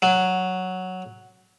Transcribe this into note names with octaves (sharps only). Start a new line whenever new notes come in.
F#3